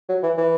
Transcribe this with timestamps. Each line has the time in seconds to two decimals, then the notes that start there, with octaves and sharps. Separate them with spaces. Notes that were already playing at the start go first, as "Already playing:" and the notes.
0.09 F#3
0.23 E3
0.38 E3